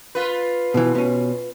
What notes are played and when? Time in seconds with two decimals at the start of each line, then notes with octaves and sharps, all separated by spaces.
0.15 F4 B4
0.74 B2 E3
0.95 B2 C#4